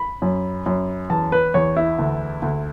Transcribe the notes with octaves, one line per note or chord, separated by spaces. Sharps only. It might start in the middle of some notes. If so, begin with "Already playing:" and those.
Already playing: B5
F#2
F#2
E2 A5
B4
E2 C#5
E4
D2
D2